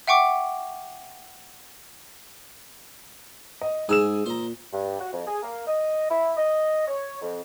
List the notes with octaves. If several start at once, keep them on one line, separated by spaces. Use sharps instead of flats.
E5 F#5 G5 C#6 D6
D#5
G#2 G#4 D#6 E6 E7
A#2 C5 A#5
G2
F#4
F2
G#4
A#3
D#5
E4
D#5
C#5
F2